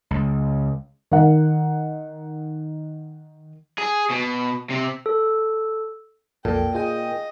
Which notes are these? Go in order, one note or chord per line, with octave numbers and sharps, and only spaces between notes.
C#2
D#3 F#5
G#4
B2
C3
A4
B1 F2 A#2 A4 G5
F4 G#4 D#5 G5